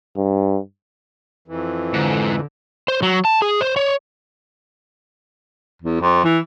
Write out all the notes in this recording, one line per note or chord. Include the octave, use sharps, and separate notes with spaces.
G2
F2 E3
G#2 D3
C5
F#3
A5
G#4
C5
C#5
E2
F2
E3